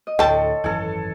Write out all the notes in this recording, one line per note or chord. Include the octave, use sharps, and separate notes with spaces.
D#5
D2 A2 A4 C#5 G5 A5 C6
G#1 F#2 E3 A4 G#5